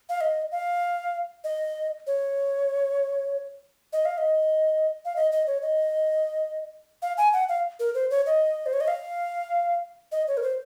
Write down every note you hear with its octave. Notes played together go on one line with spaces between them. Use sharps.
F5
D#5
F5
D#5
C#5
D#5
F5
D#5
F5
D#5
D#5
C#5
D#5
F5
G#5
F#5
F5
A#4
C5
C#5
D#5
C5
C#5
D#5
F5
D#5
C#5
A#4
C5